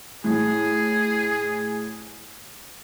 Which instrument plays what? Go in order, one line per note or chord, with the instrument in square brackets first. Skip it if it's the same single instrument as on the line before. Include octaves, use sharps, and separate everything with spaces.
[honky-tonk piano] A2 [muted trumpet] G#4